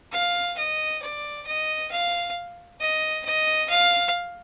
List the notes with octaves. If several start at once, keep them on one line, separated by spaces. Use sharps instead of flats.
F5
D#5
D5
D#5
F5
D#5
D#5
F5